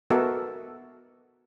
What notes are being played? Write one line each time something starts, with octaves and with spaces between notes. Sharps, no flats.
B3 F#4 A4 A#4 D#5 E5